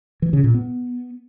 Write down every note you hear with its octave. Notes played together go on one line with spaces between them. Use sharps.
E3
C#3
A#2
B3